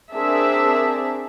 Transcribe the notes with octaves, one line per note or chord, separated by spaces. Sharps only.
C4 D4 G#4 A#4 E5 A5